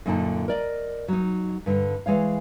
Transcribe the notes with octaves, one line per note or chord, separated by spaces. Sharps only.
F#2 A#2 D3 D#4 G#5 A5
A#4 D5 D#5
F#3 D#4
G2 D3
E3 G#3 C#5 F5